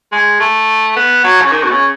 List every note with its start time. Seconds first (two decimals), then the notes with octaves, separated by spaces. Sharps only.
0.12 G#3
0.40 A3
0.97 B3
1.24 F#3
1.42 C#3
1.52 D#3
1.63 B2
1.71 C#3